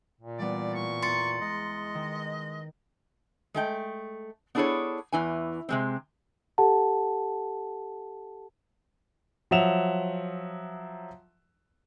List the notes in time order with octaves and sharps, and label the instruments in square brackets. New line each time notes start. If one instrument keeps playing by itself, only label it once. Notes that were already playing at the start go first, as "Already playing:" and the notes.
[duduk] A#2
[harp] E3 G3 B3 [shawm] D5
[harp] A2 [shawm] C#6
[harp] E2 A#5 [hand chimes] C6 A6 C#7
[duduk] G#3 [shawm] D#5
[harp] D#3
[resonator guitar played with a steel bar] G#3 A3 G5
B3 D4 E4 G#4 A4 C#5
E2 E3 G#5
C3 G#3 C4
[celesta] G4 A4 F#5 A5
[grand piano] F3 F#3 E5 F#5 E7 F7